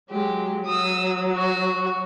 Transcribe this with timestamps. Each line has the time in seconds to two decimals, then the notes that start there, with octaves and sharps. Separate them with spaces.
0.10 F#3 G#3 G4
0.65 F#3 D#6 E6
1.35 F#4